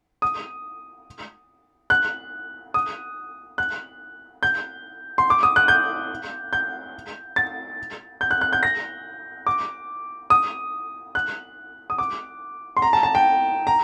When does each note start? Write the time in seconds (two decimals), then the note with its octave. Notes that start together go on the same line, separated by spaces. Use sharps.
0.22 D#6
1.90 F#6
2.74 D#6
3.58 F#6
4.43 G6
5.18 C6
5.30 D6
5.43 D#6
5.56 F#6
5.68 G6
6.53 G6
7.36 A6
8.21 G6
8.31 F#6
8.41 F#6
8.53 G6
8.63 A#6
9.47 D6
10.30 D#6
11.15 F#6
11.90 D#6
11.98 D6
12.77 C6
12.82 A#5
12.93 A5
13.03 A5
13.15 G5
13.67 A#5